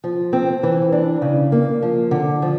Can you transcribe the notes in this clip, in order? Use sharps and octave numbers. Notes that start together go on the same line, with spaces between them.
F3
C4
E3
D4
C#3
A#3
F3
D3
F3